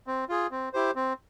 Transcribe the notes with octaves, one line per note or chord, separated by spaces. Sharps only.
C4
F4 G#4
C4
E4 G4 C5
C4